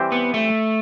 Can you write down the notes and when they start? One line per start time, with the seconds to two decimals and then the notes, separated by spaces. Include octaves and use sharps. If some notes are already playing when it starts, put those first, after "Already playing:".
Already playing: E3 G3 C4 G4 C5
0.12 B3
0.34 A3